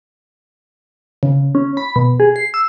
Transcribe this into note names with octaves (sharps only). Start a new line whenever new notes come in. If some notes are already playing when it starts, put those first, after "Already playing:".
C#3
C#4
B5
B2
G#4
C7
E6